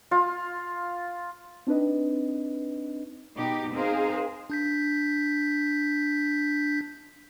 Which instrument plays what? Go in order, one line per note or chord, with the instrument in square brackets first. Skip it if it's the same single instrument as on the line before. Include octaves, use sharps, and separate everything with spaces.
[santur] F4
[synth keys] C4 D4 D#4 B4 D#5
[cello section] B2 D#4 G4
C4 D#4 G#4 A#4 C5 F5
[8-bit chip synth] D4 G6 B6